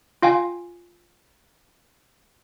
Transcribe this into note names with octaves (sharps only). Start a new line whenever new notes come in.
F4 F5 G5 G#5